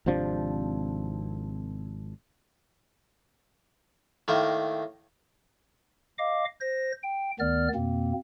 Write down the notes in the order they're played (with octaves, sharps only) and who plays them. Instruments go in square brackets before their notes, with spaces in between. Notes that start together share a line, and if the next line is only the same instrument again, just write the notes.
[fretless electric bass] G#1 C3 F3 D4
[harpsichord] A2 D#3 A#3
[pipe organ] D#5 F5 D6
C5 A#6
G5
D2 D#3 B3 D5 F6
F2 B2 A#3 C4